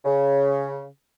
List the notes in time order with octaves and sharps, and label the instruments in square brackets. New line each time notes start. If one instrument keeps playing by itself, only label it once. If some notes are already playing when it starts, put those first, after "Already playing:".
[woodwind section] C#3